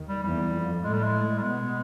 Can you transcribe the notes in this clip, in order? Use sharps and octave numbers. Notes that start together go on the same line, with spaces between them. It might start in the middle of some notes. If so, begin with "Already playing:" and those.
Already playing: D#2 D#3
G3
E2 E3 G3
F2 F3
A2 G#3 A3
G3
G#3
G3
B2 G#3 B3